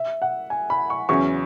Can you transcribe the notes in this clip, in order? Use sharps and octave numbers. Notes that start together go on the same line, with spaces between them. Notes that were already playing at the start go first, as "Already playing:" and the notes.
Already playing: E5
F#5
G#5
B5
C#6
E2 C#3 F#3 C#4 G#4 C#6